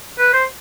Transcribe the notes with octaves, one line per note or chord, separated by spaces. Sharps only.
B4
C5